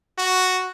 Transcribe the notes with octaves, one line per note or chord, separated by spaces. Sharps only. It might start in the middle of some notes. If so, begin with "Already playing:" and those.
F#4